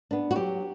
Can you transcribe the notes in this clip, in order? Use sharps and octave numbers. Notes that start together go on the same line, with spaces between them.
B3 D4
F#4
F#3 G4